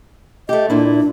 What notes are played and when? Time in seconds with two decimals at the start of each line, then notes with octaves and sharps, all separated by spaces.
0.49 A3 G4 D#5
0.70 A#2 D4 E4